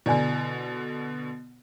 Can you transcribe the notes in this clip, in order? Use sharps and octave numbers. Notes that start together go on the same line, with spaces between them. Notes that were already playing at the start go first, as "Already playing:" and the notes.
B2 D3 E4 D5 G#5